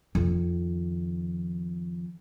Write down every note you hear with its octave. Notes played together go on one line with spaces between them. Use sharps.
F2 D#3